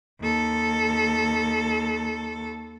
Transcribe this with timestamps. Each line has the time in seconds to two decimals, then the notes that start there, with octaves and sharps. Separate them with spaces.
0.21 D#2 A4